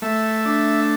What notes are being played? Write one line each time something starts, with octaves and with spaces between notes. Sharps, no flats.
A3 E5
D4